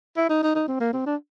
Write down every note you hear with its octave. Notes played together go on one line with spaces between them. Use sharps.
E4
D#4
D#4
D#4
C4
A#3
C4
D4